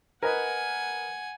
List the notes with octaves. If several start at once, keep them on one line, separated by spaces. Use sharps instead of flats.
A#4 B4 D#5 F#5 G#5